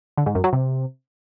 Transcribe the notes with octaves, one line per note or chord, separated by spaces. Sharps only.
D3
G#2
F#2
F#3
C3